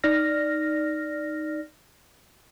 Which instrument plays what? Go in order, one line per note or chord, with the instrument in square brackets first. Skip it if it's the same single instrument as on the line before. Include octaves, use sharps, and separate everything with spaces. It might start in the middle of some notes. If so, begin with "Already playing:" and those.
[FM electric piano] D#4 D5 F6 A#6